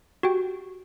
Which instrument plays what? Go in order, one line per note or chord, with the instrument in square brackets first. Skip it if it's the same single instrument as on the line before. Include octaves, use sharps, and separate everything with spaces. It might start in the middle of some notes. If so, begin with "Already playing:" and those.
[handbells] F#4 G4 G5